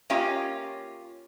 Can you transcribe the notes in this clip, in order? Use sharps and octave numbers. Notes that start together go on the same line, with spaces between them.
A#3 C#4 F4 G4 D#5